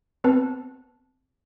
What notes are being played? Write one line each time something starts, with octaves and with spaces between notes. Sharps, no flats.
B3 C4 B4 A5